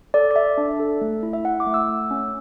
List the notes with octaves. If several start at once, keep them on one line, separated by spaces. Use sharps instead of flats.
A4 D5
D5
A4 E5
D4
A4
A3
E4
E5
E4 F#5
D6
A3
E6
A3
C#4